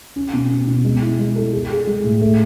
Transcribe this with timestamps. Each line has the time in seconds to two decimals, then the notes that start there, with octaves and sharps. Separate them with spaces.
0.16 C#4
0.33 B2
0.51 C#4
0.67 B2
0.85 G#3
1.02 E4
1.19 G#3
1.36 A4
1.53 G#4
1.70 G#4
1.87 G#3
2.04 A2
2.21 A3